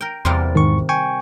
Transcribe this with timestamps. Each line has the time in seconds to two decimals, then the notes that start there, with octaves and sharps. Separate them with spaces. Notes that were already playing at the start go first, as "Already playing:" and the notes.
0.01 A#4 G5
0.25 E2 C3 G3 A#3 C6 F6 A6
0.55 G#2 D#3 C#6
0.89 G5 G#5 C#6